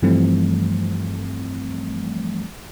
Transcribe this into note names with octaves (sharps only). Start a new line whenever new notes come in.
G2 E3 F3 G3 A3 C4